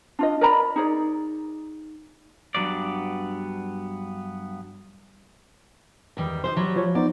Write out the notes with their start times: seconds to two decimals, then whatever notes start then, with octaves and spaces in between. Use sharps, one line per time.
0.19 D4 F4 D#5
0.41 A#4 D5 A#5 B5
0.76 D#4 G#4 D5
2.55 G2 B2 F#3 B3 D5
6.17 E2 D#3 G3
6.44 D#4 G4 C5 C6
6.56 F#3 G3
6.76 F3 C#5
6.95 B3 D#4 C5 D5